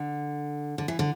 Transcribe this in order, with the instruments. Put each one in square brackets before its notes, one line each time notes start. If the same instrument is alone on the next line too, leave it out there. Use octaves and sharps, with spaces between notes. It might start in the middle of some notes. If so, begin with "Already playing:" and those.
Already playing: [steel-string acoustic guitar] D3
D3
E3
D3